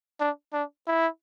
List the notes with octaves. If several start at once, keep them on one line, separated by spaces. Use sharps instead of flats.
D4
D4
E4